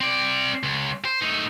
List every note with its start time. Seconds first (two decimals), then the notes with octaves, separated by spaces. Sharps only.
0.01 C4 D5
0.63 C#2
1.05 C5
1.22 A3 D#4